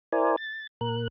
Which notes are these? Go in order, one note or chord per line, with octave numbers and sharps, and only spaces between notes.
E4 A#4 C5 D5 G#5
A6
A#2 A#4 F#6